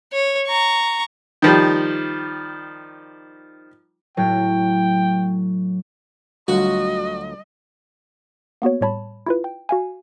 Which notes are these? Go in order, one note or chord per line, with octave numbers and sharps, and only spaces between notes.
C#5
A#5 C#6
D#3 F3 G3
A2 F#3 G5
D2 F#3 G3 F4 F#4 D#5
A#3 B3 F#4 C#5
A2 G3 C#5 A5 B5
E4 F4 B4
G5
F#4 F5 G#5